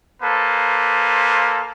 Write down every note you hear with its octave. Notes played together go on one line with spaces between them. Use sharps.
A#3 A4 B4 C5